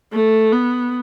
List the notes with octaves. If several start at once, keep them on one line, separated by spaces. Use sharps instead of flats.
A3
B3